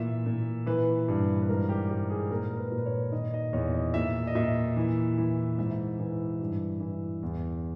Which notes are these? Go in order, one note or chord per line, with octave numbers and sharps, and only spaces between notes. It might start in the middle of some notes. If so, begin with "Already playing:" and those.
Already playing: A#2 E3 E5
A#2
E3 B4
G2
B4
G#2 A#4
G4
G#2 G4
G#4
A#2 A#4
B4
A#2
B4
C#5
D#3 D#5
D#5
E2 C#5
D#5
A#2 E5
D#5
A#2 E5
E3
E3
G#2 E5
E3
G2
E3
E2